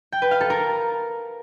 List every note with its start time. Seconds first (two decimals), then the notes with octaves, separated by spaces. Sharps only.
0.12 G5
0.22 B4
0.31 F5
0.41 A4
0.50 A#4